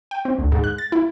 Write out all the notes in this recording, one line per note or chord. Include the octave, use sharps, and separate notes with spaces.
G5
C4
D2
G#2
F#6
A6
E4